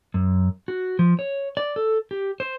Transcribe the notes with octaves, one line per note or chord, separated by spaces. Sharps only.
F#2
F#4
F3
C#5
D5
A4
G4
C5